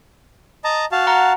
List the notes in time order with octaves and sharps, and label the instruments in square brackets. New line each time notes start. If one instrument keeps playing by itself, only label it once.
[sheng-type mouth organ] D#5 A5 A#5
F#4 F5 A5
[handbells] F#5 A#5